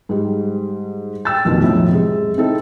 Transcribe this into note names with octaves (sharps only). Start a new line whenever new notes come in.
G#2 G3
G5 E6 A6
F1 A#1 B2 D#3
B1 F2 A2
C3 G#3
C4 D#4 E4 A4